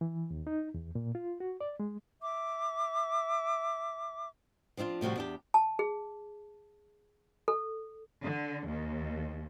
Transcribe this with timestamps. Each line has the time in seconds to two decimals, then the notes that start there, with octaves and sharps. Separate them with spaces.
0.01 E3
0.31 D#2
0.47 D#4
0.74 E2
0.95 A#2
1.15 F4
1.40 F#4
1.61 D5
1.80 G#3
2.22 E5 D6
4.77 F3 C4 D4 E4 F4
5.01 A2 C3 F3 G3 F#4
5.16 E2 D4 G4
5.54 A5
5.79 G#4
7.48 A4
8.23 D3
8.68 D#2